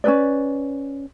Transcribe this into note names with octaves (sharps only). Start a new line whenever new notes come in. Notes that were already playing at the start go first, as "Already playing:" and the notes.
C#4 D#4 B4 D5